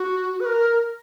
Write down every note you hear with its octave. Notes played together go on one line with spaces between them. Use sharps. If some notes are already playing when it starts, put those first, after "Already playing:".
Already playing: F#4
B4
A#4